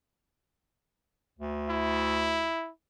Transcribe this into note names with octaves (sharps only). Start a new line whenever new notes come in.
D2
E4